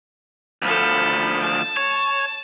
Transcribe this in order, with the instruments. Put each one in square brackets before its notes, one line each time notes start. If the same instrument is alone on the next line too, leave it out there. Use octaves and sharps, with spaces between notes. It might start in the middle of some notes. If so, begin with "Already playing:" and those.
[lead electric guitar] D2 F3 [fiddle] A4 B5
[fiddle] A5
[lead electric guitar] C#5